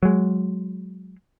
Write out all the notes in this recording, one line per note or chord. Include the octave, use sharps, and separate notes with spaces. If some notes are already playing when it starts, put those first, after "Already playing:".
F#3 G#3